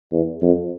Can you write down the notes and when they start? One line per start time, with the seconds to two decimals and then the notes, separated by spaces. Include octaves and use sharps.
0.12 E2
0.42 F2